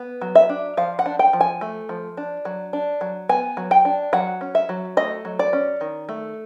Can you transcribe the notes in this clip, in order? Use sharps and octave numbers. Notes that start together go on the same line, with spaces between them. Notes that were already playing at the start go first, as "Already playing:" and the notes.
Already playing: B3
F#3
E5
D4
F3 F5
F#5
D4
G5
F3
G#5
A3
F3
D4
F#3
D4
F#3
B3 G#5
F#3
G5
D4
F#3 F#5
C#4
E5
F#3
A3 D#5
F#3
D5
C#4
D#3
A3